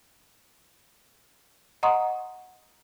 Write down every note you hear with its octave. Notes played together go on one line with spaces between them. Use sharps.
D#5 F#5 A#5 C6 C#6 D#6